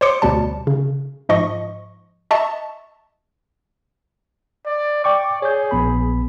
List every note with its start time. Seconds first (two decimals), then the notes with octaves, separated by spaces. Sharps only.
0.01 C5 C#5 C6 D6 C#7
0.22 D2 B2 G3 A5
0.67 C#3
1.29 G#2 F3 D#5 C#6
2.31 D#5 E5 A5 C#6
4.66 D5
5.04 D5 G5 C#6 D6
5.42 G#4 C#5 G6
5.71 A#1 B3 B5